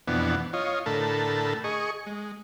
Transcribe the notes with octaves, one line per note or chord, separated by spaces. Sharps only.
F2 B2 E3 B3 D4
F4 C#5 D#5
A2 D3 A4 A#4 A5 B5
G#4 D#5 C#6
G#3